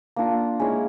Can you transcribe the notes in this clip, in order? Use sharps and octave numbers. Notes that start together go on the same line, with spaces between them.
A#3 D4 F4
G#3 C#4 E4